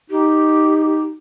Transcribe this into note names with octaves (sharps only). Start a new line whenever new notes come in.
D#4 G4